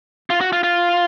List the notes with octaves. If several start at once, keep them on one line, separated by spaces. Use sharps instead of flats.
F4
F#4
F4
F4